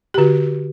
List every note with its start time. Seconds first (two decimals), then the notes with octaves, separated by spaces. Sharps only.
0.14 G4
0.18 D3 F#4